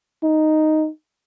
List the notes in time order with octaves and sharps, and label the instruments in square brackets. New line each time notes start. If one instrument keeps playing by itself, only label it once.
[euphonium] D#4